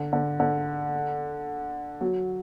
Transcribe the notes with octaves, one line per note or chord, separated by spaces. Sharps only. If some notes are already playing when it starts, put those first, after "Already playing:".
Already playing: D3
D3
D3
F#3